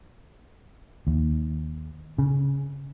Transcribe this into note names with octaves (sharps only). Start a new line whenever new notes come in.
D#2
C#3